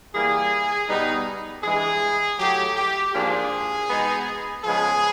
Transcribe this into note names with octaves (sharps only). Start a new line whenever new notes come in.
E3 G3 A#3 G#4
B2 G3 B3 D#4
G2 E3 G#3 G#4
A2 F#3 A3 G4
G4
G#2 F3 A#3 D4 F4 G#4
B2 G#3 B3 D#4
C#3 F3 G#3 B3 G#4